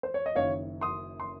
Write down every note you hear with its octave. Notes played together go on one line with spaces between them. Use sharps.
C5
C#5
D#5
F#1 F#2 D#3 C#5 F5
C6 D#6
C6